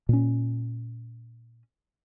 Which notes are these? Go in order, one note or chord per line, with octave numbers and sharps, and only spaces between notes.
A#2 C#4